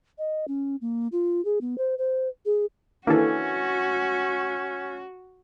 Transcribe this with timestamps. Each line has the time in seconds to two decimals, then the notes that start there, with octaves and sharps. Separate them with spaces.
0.18 D#5
0.48 C#4
0.81 A#3
1.12 F4
1.45 G#4
1.61 B3
1.78 C5
1.98 C5
2.46 G#4
3.07 E3 A#3 C#4 D4 E4 F#4 A4